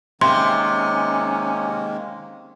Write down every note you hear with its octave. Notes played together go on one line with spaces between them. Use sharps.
C3 D#3 G#3 A#3 C#4 C6